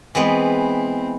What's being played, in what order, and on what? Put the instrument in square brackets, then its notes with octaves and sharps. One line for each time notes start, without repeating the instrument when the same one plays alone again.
[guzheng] E3 G#3 B3 [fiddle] C4